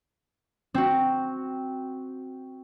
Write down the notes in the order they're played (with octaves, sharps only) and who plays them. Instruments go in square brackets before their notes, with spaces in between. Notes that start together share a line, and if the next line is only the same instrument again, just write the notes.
[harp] C4 F#4